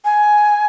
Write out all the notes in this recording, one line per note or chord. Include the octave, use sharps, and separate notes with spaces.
G#5